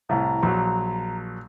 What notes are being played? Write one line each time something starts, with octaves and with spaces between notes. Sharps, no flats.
C2 A2 A#5
A#1 F#3